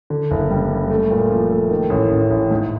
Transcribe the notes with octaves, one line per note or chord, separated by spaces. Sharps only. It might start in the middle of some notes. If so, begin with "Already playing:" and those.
D3
F#1
G3
G3
A3
A#2
F3
A3
D#3
A1
A1
A1
G#2